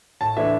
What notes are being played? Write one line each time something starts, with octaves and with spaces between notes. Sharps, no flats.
A2 A5
E3 A3 D4 E5